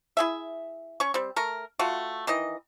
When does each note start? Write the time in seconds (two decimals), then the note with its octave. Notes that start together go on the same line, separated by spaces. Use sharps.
0.17 E4 G#4 E5
1.00 C#4 C#6
1.14 G3 C4
1.36 A3 A#4
1.79 A3 F4 F#4
2.27 D#3 E3 D#5